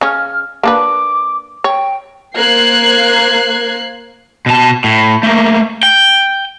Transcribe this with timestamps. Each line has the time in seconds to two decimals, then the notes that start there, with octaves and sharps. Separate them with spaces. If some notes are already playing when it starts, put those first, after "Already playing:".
0.01 C#3 C#4 F6
0.63 A#3 D4 B4 D6
1.64 C#5 G5
2.37 A#3 C5 F#6 G#6 C7
4.46 B2 A5
4.84 A2
5.23 A3 A#3
5.83 G5